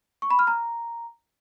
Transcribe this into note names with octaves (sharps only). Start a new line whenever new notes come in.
C#6
B5
F6
A#5